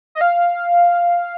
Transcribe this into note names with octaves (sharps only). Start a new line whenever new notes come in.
D#5
F5